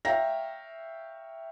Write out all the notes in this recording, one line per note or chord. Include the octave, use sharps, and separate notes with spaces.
C#5 E5 F5 G5 A#5 A#6